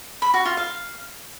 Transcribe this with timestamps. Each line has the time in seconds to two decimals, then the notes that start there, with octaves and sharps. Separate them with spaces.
0.22 B5
0.34 F#4
0.45 F4
0.57 F5